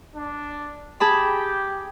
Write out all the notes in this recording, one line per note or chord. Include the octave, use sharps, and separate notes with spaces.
D4
G4 G#4 A5 B5